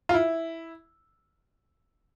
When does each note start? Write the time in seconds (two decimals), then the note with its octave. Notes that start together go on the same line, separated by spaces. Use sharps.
0.09 F4
0.14 E4